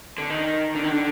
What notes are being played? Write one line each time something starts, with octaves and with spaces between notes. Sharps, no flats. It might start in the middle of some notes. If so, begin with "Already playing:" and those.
D3
D#3
D3
D#3
D3